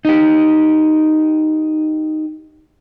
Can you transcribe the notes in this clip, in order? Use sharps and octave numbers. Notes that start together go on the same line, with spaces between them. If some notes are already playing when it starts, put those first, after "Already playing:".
D#4 G4